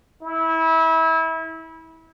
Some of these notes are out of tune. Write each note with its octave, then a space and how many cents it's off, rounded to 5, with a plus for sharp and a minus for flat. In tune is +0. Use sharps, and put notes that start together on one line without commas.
E4 -25